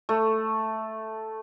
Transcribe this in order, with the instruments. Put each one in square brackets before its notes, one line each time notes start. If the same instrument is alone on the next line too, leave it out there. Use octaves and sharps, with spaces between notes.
[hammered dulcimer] A3